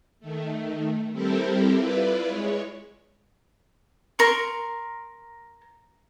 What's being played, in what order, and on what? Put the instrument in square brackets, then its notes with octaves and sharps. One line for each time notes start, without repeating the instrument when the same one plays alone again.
[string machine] D#3 A3
G3 C4 E4 G4 A4 A#4
E4 F4 B4 D5
G#3 C#5
[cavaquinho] A#4 C6 C#6